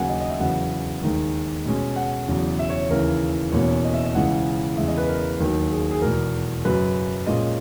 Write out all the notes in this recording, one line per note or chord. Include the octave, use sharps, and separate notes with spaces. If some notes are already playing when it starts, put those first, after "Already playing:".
Already playing: D#2 C#3 F#3 A#3 F#5 G#5
D#5
D#5
E5
E2 C#3 F#3 B3 F#5
D#2 D#3 G#3
B2 G#3 C#4
F#5
E2 C#3 F#3
E5
C#5
D#2 C#3 E3 A#4
E2 B2 A#3 C#4 C#5
D#5
E5
D#5
C#2 C#3 E3 G#3 F#5
E2 C#3 G#3 E5
D#5
B4
A#4
D#2 D#3 F#3 A#3
G#4
G#4
E2 B2 G#3 A#4
F#2 C#3 F#3 B4
A#2 G#3 C#4 D#5